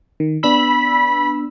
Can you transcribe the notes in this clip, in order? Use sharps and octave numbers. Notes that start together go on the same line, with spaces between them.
D#3
B3 D4 B5 E6